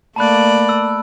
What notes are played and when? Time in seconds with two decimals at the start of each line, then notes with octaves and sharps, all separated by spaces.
0.16 A3 A#3 D5 A5 B5 F#6
0.69 E6